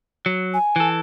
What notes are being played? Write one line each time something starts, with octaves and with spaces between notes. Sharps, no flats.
F#3
G#5
E3 A4